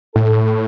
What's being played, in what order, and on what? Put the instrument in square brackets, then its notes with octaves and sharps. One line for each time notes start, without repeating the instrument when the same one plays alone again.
[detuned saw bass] A2 [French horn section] A4